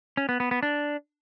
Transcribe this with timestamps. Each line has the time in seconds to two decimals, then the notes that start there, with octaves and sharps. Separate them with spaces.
0.17 C#4
0.29 B3
0.40 B3
0.51 B3
0.63 D4